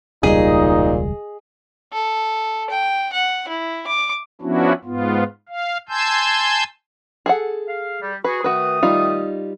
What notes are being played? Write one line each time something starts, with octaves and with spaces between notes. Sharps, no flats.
E1 C#2 A#2 G3 D#4 G#4 D#5
A4
G5
F#5
E4
D6
F3 B3 C#4 D4 E4 F#4
G#2 B3 F4
F5
G#5 A5 C6 E6 G6
G#4 A4 F#5
F5
G3
F#4 G#4 B4
D#3 A3 F#4 B4 D#6
G3 D#4 F4